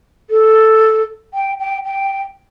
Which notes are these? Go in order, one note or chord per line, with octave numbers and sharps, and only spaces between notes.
A4
G5
G5
G5